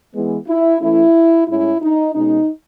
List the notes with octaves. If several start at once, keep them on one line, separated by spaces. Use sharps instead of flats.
E3 G#3 B3
E4
E3 A3 C#4 E4
A2 G#3 C#4 E4
D#4
B2 G#3 C#4 D#4